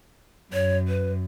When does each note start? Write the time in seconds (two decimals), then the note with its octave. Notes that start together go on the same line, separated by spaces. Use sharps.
0.53 F#2 C#5
0.88 B4